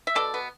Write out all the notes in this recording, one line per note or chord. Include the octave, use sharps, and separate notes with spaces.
E5
B2 A4 D5
B3